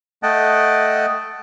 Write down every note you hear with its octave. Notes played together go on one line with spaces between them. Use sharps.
A3 D#5 F#5 G5 A5